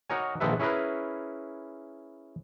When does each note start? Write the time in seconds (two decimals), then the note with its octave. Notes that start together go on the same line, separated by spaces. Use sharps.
0.10 D#4 F#4 A#4 C#5 G#5
0.40 A#1 D#3 G#3 A4 B4 E5
0.59 C#4 E4 G#4 A#4 B4